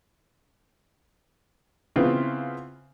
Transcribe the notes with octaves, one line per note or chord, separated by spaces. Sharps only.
C#3 B3 C4 E4 F4